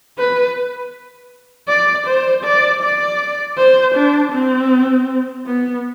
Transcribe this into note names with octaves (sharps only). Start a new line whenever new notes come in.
B4
D5
C5
D5
D5
C5
D4
C4
B3